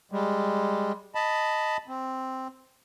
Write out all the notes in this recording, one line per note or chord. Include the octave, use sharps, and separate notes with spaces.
G3 G#3
D#5 A5 B5
C4